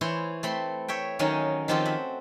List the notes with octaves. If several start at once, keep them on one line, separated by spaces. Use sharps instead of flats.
E3 E4 C5 C#5 C6
A3 C4 B5 C6
C#5 E5 G5
D#3 F#3 C#4 D#4
D#3 F3 C4 F4 G4 A4
F#4 E5